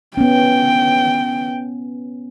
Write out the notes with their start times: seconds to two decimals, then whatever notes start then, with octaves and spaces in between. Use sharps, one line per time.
0.17 B3 C#4 G5